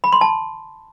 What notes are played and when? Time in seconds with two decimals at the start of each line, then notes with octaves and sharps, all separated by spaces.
0.04 B5
0.12 C6
0.21 A5